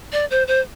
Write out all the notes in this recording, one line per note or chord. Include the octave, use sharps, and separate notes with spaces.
D5
C5
C5